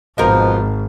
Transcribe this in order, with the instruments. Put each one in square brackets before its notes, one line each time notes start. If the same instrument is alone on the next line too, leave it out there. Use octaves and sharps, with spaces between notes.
[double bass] G#1 [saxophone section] B2 F3 [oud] D#4 A#4